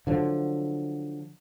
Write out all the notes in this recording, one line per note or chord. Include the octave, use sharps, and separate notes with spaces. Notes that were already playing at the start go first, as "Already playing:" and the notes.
D3 F3 F#3